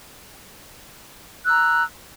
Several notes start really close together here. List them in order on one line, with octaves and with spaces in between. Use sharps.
F#6 E6 A#5